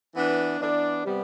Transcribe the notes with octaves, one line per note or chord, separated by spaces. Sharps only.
E3 B3 D4
E3 B3 D4
C3 G3 B3